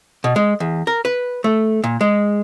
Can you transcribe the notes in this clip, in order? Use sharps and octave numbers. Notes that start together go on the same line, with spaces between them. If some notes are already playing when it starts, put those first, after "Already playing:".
B2
G#3
E2
A#4
B4
A3
A#2
G#3